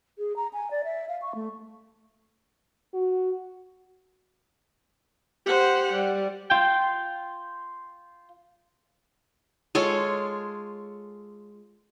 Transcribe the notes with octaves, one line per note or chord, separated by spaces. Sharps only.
G#4
A#5
G#5
D5
E5
F5
C#6
A3
F#4
G4 C5 F#5
G3
F4 G5
G#3 F4 A4 C#5